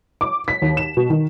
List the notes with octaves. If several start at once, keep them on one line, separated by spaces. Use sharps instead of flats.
D6
B6
D#2
E7
B2
D#3